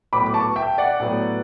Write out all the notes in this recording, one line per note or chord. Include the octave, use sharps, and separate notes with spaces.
A2 F#3 B3 B5 D6
D6
A5 C#6
E5 G5
D5 F#5
A2 F#3 B3